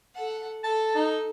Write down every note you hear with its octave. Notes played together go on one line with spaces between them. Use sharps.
A4 F#5
A4 A5
D#4